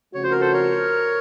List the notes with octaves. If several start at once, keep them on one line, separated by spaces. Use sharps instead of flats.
C#3 F3 A3 C4 F#4 C#5
C5
A#4
A4 C5
A#4 C#5